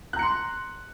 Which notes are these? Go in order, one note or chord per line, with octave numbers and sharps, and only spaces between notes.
A#5 C6 F#6 C#7